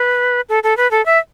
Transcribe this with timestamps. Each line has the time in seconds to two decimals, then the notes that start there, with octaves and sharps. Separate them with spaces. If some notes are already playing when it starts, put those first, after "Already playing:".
Already playing: B4
0.49 A4
0.63 A4
0.77 B4
0.91 A4
1.06 E5